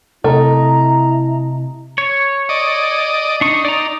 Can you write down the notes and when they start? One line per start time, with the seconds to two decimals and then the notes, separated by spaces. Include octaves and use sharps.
0.24 C3 A3 E4 D#5 A#5
1.98 C#5
2.49 D5 D#5
3.41 D4 D#4 C#6
3.65 D5 A#5